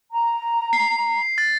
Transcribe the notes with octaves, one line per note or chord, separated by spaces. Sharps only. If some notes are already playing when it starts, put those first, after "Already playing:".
A#5
C7
A6